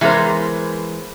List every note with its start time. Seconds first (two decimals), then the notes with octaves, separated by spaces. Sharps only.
0.01 E3 G#3 B3 A#4 C5